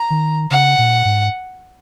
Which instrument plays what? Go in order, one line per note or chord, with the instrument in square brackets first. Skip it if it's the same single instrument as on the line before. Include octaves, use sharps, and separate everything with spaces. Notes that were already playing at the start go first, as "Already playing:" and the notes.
Already playing: [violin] A#5
[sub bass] D#3
[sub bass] C#3 [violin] F#5
[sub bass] A#2
G#2